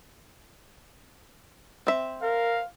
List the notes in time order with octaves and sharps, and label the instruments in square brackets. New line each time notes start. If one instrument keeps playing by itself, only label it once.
[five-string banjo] C4 E5
[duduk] A#4 [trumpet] F5